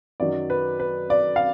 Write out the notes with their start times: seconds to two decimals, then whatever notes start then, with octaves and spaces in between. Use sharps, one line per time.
0.20 F#2 D#3 F#3 D5
0.50 B4
0.80 B4
1.10 D5
1.36 F5